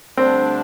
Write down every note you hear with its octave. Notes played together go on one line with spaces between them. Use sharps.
D2 D3 G3 C4 D4